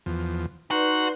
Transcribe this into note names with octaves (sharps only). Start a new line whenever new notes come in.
E2 F3
D#4 F#4 B4 D5 C6